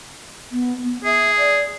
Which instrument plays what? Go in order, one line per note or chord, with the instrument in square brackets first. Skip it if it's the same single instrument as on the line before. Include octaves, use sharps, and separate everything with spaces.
[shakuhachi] B3
B3
[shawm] G#4 [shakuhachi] E5
[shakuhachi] D5